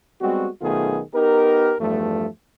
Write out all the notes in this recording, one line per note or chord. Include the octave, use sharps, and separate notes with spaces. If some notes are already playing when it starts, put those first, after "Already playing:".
G3 G#3 B3 C4 F#4
B1 D#3 A3 B3 F4 G#4
B3 D#4 G4 A#4
E2 G2 F3 A3